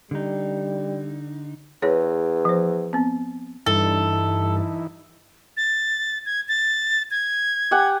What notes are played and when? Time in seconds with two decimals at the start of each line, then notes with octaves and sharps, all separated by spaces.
0.11 D3 G3 D#4
1.82 E2 G#4 B4 C#5
2.45 F3 C5
2.93 B3 C4
3.66 G2 E3 D#4 E4 A4
5.57 A6
6.26 G#6
6.48 A6
7.11 G#6
7.71 G4 F#5 G#5